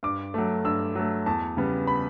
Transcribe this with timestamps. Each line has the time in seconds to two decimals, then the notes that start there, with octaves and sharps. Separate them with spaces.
0.03 G2 D6
0.34 F#3 A3
0.64 G2 E6
0.95 F#3 A3
1.26 E2 A5
1.57 C#3 G3 B3
1.87 B5